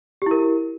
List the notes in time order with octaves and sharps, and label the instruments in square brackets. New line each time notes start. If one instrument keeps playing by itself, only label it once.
[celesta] G4
E4
A#4